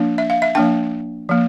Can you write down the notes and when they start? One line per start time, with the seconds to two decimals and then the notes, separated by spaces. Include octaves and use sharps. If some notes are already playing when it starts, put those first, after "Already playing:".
Already playing: F3 A#3 D4
0.18 E5
0.30 F5
0.42 E5
0.55 F3 A#3 D4 G5
1.29 F3 A#3